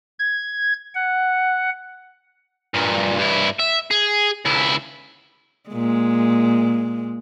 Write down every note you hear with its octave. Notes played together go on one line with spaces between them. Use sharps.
G#6
F#5
G2 A#2
G2 E4
E5
G#4
C#2 E4
A#2 G#3